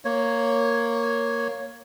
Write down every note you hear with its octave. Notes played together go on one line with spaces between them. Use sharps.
A#3 C#5